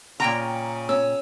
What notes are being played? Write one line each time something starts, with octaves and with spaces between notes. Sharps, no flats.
A#2 C#3 G5 A#5
C#4 E6